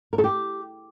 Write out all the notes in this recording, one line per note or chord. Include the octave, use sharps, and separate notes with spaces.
A#4
A4
G4